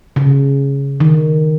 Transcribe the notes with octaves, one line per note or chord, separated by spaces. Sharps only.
C#3
D#3